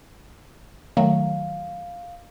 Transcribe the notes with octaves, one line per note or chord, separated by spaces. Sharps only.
D#3 F#3 A3 F5